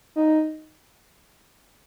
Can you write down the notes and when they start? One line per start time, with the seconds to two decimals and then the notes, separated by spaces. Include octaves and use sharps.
0.16 D#4